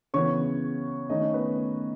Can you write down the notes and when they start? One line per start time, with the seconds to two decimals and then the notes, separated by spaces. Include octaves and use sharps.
0.14 C#3 E3 B3 C#5 C#6
1.09 D#3 A3 C#4 D#4 D#5
1.21 C#4 C#5
1.34 B3 B4